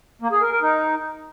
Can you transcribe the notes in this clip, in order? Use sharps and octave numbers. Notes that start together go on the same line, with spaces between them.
A#3
G#4
A#4
A#4
D#4